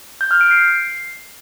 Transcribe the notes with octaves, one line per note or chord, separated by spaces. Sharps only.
G6
F6
D7
C7